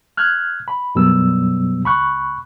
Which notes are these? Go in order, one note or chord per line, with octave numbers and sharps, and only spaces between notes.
F6 F#6 G#6
B5
F#2 B2 F#3 G3 B3 E6
C#2 B5 C#6 F#6